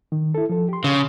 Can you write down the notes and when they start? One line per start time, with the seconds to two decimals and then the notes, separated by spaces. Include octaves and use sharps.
0.12 D#3
0.35 E4 A4
0.49 F3 A4
0.69 G4 C6
0.84 C#3